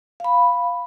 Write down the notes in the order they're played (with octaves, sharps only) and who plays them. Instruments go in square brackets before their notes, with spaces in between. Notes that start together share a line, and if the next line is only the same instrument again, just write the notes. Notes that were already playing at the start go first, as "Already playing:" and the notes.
[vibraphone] F5 B5